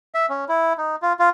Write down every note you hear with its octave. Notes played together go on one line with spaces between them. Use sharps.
E5
C#4
E4
D#4
F4
F4